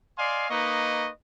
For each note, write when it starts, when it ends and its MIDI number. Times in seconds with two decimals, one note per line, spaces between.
0.19 0.48 74
0.19 0.48 75
0.19 0.48 77
0.19 0.48 80
0.19 0.48 84
0.50 1.09 58
0.50 1.09 63
0.50 1.09 71
0.50 1.09 75
0.50 1.09 85